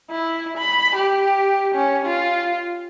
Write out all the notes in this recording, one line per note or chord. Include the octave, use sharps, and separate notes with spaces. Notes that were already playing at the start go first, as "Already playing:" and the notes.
E4
B5
G4
C#4
F4